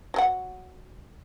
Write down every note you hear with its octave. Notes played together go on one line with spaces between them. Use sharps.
F#3 A4 F#5